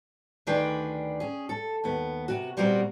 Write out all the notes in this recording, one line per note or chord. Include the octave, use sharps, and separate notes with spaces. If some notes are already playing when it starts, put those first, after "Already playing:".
D2 D#3 D4 G#4 B4 G5
C#4 G#4
A4
D#2 B3
C3 F#4
A#2 G3 B3 C4 F#4 A#4